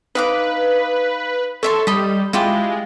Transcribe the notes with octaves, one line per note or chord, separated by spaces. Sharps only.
D#4 B4 F5 D6
A4 C#5 E5 C6
G3 D#5 B5
G#3 E4 F4 G4